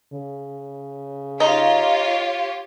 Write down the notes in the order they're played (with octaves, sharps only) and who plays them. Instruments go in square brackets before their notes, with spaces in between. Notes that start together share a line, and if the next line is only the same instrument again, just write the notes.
[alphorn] C#3
[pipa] D#4 [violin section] F4 G4 C#5